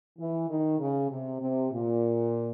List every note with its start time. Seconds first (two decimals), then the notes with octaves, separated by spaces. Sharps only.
0.19 E3
0.49 D#3
0.80 C#3
1.10 C3
1.41 C3
1.72 A#2